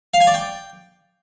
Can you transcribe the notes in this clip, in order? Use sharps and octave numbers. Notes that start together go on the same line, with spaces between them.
F5
G#5
D5
G5